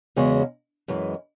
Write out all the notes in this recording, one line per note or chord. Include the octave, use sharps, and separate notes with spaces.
E2 C#3 G#3 C#4 F#4
F#2 E3 G#3